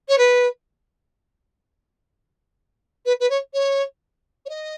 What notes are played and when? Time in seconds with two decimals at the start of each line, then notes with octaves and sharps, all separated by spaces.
0.09 C#5
0.18 B4
3.05 B4
3.20 B4
3.30 C#5
3.53 C#5
4.46 C#5
4.49 D#5